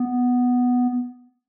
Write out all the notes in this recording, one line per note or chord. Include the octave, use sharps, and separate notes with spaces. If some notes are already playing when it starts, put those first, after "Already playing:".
Already playing: B3